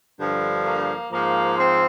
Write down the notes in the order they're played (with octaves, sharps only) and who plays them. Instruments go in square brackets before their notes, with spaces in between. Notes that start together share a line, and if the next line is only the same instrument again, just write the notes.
[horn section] G2 D3 F3
A#3
G#2 F3 A#3
C4